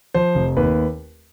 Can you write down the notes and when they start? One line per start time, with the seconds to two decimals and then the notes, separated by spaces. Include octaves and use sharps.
0.14 F3 C5
0.35 F1
0.57 D#2 B4